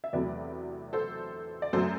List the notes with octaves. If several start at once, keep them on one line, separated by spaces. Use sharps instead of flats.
E5
E2 C3 F#3 A3 B4 D5
A4 C5
D5
F#2 F#3 A3 A4 C5